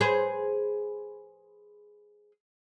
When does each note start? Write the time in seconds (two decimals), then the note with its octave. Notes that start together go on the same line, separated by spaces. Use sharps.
0.01 G#4 B4 C5